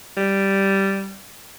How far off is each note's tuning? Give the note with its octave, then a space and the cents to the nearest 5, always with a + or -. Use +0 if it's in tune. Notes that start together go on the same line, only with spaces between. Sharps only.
G3 -5